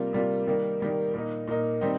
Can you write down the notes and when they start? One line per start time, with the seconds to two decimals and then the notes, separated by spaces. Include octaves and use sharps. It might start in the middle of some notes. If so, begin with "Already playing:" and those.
Already playing: C3 G3 A#3 F4
0.13 C3 G3 A#3 F4
0.47 D#3 G3 A#3
0.80 D#3 G3 A#3
1.14 A#2 A#3 D#4
1.47 A#2 A#3 D#4
1.81 D#3 G3 C4 D#4